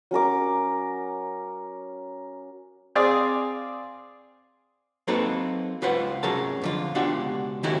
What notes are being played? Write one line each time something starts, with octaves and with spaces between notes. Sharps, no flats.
F#3 C#4 A#4 D6
C4 G#4 D5 F5
F#3 A#3 C4 D#4 A4 B4
C#2 F4 B4 C5 F#5
C3 F#3 C#4 G#4 A#4 A5
F2 D3 F4
C#2 B2 D4 F4 G4 F#5
D#3 C#4 E4 F#4 G4 A4